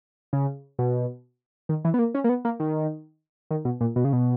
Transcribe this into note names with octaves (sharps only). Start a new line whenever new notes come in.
C#3
B2
D#3
E3
B3
A#3
C#4
A#3
B3
A#3
D#3
D#3
B2
A#2
B2
C#3
B2